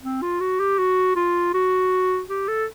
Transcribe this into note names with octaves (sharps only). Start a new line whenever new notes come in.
C4
F4
F#4
G4
F#4
F4
F#4
G4
A4